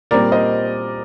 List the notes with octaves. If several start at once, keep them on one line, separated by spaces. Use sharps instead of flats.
A#2 G3 C4 A#4 D5
C5 D#5